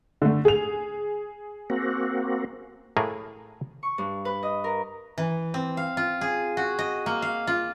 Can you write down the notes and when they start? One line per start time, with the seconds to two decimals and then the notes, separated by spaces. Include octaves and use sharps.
0.22 D3 A3
0.45 G#4 F7
1.70 A#3 C4 F#4
2.97 A2 A3 A#3 G#4 A#4
3.83 C#6
3.98 G2
4.25 B4
4.43 D#5
4.64 A#4
5.18 E3
5.54 C4
5.77 F5
5.97 F4
6.21 G#4
6.57 F#4
6.79 D#5
7.06 A#3
7.22 F5
7.47 F4